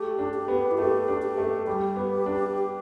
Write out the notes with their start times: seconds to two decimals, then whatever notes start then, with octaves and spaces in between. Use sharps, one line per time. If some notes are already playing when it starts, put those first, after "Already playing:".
Already playing: A3 G4
0.19 D4
0.34 G4
0.48 B3
0.71 E4
0.78 A3 G4
1.08 D4
1.22 G4
1.38 A3
1.67 G3 G4
1.96 B3
2.26 D4